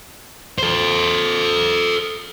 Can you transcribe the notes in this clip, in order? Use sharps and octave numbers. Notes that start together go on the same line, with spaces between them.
A4 C5